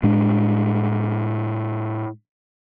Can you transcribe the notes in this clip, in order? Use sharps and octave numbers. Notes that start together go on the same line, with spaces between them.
A2 G#3 D4